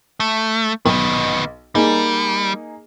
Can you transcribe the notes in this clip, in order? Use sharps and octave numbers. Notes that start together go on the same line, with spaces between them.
A3
B1 D#3 B3
G3 A#3 D#4 G#4